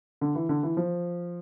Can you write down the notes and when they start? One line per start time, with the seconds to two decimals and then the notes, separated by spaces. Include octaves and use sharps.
0.21 D3
0.35 E3
0.49 D3
0.63 E3
0.77 F3